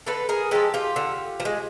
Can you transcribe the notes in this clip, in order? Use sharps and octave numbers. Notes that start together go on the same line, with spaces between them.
D3 A4 B4
G#4 A#4
F3 G#3 G4 A4
F4 G4
D3
F3
G#3